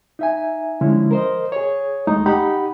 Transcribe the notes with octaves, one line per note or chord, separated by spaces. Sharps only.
D#4 E5 G#5
D3 F3 G#3 C#4 E4
A#4 C5 D#5
G#4 C#5
D#2 G#3 A3 D#4
D#4 G4 F#5 B5